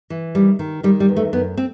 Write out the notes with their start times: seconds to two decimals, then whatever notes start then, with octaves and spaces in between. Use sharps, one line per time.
0.10 E3
0.35 D#3 G3
0.59 D#3
0.83 D#3 G3
1.00 G3
1.08 E2
1.17 A3
1.33 F#2 B3
1.57 C4